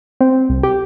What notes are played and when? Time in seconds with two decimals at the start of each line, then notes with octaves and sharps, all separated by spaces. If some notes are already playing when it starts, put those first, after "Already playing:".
0.21 C4
0.49 C2
0.63 G4